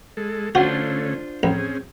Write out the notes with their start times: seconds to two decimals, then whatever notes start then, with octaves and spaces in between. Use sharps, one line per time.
0.17 G#3 A4
0.55 D3 A3 C#4 D4 F4 F#4 C5
1.43 A1 C4 C#4 G#4